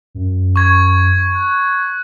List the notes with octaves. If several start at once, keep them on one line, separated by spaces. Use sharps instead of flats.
F#2
C#6 G#6
F#6